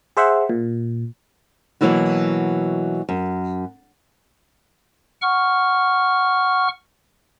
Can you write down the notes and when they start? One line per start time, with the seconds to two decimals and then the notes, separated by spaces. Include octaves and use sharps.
0.17 G#4 C5 E5 F#5
0.49 A#2
1.81 B2 E3 F#3 A#3 E4 F#4
3.09 F#2
5.22 F#5 C#6 F6